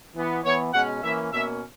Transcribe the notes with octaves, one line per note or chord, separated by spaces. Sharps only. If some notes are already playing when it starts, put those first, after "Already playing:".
E3 B3
E3 B3 C#5
B2 G#3 C#4 F#5
E3 A#3 C#4 E5
B2 A#3 C#4 E5